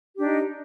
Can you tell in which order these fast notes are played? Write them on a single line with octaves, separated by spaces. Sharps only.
G4 D4 D#4